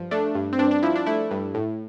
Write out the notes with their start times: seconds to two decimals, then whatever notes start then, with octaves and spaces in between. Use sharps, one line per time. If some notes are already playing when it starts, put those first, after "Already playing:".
Already playing: G2 F3
0.11 A3 D4
0.35 G2
0.53 C4
0.58 G2 D4
0.71 D4
0.83 F3 E4
0.96 D4
1.06 A3 E4
1.31 G2
1.55 A2